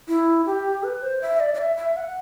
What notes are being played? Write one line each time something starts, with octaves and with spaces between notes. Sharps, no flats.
E4
G4
B4
C5
E5
D5
D5
E5
E5
F#5